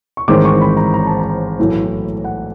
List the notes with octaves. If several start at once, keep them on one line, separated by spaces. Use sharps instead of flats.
C#6
A1 G#2 D#3 G#3 C4 D6
C#6
B5
A#5
A#5
A5
A#5
B1 A2 E3 A3
F#5